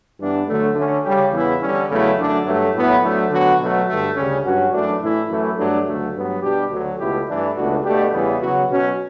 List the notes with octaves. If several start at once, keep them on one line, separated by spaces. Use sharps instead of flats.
G2 E3 B3 D4
D2 D3 F#3 A3
D3 A3 C#4
C#3 G3 C#4 G4
E2 C#3 E3 B3 E4
D3 G3 C#4
E2 C#3 F#3 A3 E4
F#2 D3 A3 D4
G2 F#3 A3
A2 F#3 B3 E4
D2 D3 F#3 A3
D3 F#3 B3 F#4
B2 F#3 A3
G2 D3 A3
D2 C#3 G3 C#4
G2 F#3 C#4 F#4
F#2 E3 A3 D4
A2 E3 A3 E4
F#2 E3 A3 E4
G2 F#3 A3 D4
D2 C#3 F#3 A3
G2 F#3 B3
B2 G3 D4 G4
D2 D3 F#3
C#2 B2 A3 E4 G4
G2 E3 A3 D4
C#2 B2 A3 D4 F#4
B2 A3 D4 G4
E2 C#3 E3 G3 B3
C#3 F#3 B3 F#4
B2 F#3 C#4 F#4